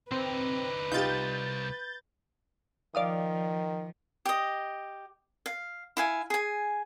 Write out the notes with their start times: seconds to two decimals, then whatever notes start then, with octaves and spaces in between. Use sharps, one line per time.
0.12 D3 C4 D#4 B4
0.92 C2 D#4 F4 G4 G6 A6
2.95 D#3 F3 D5 F5 D#6
4.26 G4 D#5
5.46 F5
5.97 E4 F5 G#5
6.30 G#4 G#5